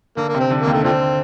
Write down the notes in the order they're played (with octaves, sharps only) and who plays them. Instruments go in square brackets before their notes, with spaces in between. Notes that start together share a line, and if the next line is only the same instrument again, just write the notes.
[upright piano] D3 [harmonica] A#3
[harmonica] A#3
[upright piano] C3
[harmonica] C4
[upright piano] D3
[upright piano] D#2 D#3 [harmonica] A#3
[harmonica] A3
[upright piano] D3 [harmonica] F3 A3 C4